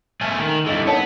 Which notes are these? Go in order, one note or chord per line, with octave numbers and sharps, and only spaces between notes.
A3 G#4 B4
D#3
G2 E3 A4 D#5
B3 D#4 A#4 C#5